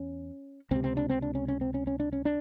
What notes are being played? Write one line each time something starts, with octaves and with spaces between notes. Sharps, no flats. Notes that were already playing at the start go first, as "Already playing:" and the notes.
Already playing: E2 C#4
C#2 C3 C4
C4
D4
C4
D4
C#4
C#4
C4
C#4
C#4
D4
C#4
D4